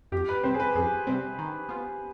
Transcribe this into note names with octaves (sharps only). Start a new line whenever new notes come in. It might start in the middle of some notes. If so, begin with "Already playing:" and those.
F2 G4
B4
C3 G3 C4 C5
G#4
B4
F2 G#4
C3 G3 C4
D#3
B3 F4